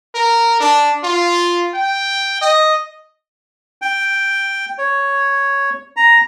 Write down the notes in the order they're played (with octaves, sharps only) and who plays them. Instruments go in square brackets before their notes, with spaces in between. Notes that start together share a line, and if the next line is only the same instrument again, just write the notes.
[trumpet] A#4
D4
F4
G5
D#5
[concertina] G5
C#5
A#5